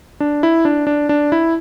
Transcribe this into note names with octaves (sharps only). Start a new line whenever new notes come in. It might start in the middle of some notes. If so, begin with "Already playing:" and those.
D4
E4
D4
D4
D4
E4